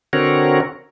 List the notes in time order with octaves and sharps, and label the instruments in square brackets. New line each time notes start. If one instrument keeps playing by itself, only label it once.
[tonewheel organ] D3 C4 F#4 A#4 C#5